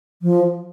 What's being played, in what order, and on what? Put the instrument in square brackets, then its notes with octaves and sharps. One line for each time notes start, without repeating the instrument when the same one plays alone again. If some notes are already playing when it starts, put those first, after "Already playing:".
[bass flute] F3